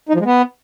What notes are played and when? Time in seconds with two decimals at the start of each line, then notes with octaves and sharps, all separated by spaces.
0.09 D#4
0.14 F3
0.20 G#3
0.26 B3